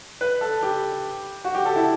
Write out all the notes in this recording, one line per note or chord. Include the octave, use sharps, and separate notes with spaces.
B4
A4
G4
F#4
G4
A4
E4